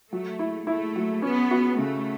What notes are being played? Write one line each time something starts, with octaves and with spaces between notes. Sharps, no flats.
F#3 A3
E4
A3 E4
F#3
B3 C#4
F#4
C#3 A3